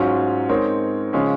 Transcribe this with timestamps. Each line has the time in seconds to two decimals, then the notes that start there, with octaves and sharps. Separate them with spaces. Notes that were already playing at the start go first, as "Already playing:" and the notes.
Already playing: G#2 F#3 C#4 F4
0.49 G#3 C4 D#4 A#4 C#5
1.13 C#3 F3 G#3 C#4